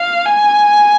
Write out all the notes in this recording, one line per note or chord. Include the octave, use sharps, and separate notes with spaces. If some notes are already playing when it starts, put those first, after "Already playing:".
Already playing: F5
G#5